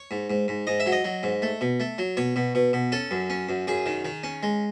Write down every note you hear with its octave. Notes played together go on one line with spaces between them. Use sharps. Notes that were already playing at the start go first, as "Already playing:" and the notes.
Already playing: C#5
G#2
G#2
G#2
G#2 D#5
E5
F#3
D#5
F#3
G#2
A3
B2
A3
F#3
B2 C#5
B2
B2
B2
C#4 A4
F#2
C#4
F#2
F#2 G#4
D#3
D#3
C#4
G#3